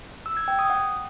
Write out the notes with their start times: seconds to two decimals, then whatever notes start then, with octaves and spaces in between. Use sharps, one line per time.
0.26 E6
0.37 G#6
0.48 G5
0.59 D#6
0.70 F#5